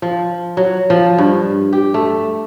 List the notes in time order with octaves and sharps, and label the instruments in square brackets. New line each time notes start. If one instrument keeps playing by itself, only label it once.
[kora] F3
F#3
F3
G2
G4
A3